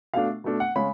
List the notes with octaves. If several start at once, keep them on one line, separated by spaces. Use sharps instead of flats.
B2 A3 D4 F5
B2 A3 D4
F#5
C#3 G#3 C#4 B5